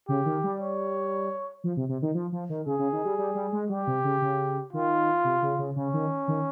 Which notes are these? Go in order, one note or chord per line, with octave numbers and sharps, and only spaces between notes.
C#3 G4
D#3
G3
C#5
F3
C3
C3
D#3
F3
F3
D#3
C#3 G#4
C#3
D#3
G3
G3
G3
G#3
G3 G4
C3
C#3
C#3
D#3 F4
C3
C#3
C#3
C#3 C#4
D#3
D#3